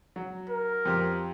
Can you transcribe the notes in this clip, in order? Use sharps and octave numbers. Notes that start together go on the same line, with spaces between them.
F#3
A#4
F2 G4 C5